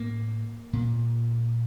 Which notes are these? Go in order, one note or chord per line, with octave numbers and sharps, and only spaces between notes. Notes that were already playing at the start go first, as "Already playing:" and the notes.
Already playing: A2 A#3
A#2